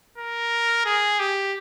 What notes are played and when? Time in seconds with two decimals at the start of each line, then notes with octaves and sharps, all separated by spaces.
0.18 A#4
0.85 G#4
1.20 G4